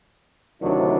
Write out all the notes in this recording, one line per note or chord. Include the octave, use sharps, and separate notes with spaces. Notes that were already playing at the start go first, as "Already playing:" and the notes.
D2 C3 D#3 F#3 D4 E4